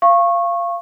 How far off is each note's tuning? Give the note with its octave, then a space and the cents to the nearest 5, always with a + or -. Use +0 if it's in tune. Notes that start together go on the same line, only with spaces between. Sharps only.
F5 -20 C#6 -15